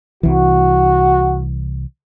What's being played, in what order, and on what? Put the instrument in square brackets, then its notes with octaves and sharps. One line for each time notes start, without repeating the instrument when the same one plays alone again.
[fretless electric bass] C2 E3 [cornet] F#4